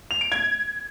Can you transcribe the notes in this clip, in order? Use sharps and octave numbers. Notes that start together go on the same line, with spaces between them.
F7
D7
G#6